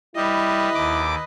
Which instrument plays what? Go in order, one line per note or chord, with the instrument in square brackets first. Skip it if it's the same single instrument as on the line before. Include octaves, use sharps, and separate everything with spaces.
[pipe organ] G3 [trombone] E4 [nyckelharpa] B4 D#5
[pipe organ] D#2 D6